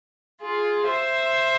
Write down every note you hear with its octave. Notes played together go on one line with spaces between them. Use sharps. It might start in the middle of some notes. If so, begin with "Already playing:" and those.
F4 G#4
C5 E5